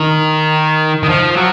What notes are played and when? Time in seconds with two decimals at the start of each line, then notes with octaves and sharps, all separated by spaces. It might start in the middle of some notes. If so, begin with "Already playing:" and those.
Already playing: D#3
1.03 D#3
1.09 F3
1.36 F#3